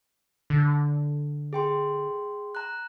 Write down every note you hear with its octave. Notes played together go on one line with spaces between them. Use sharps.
D3
G#4 G5 C6
A#5 F#6